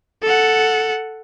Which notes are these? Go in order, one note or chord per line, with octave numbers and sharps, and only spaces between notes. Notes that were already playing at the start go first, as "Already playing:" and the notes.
A4 F#5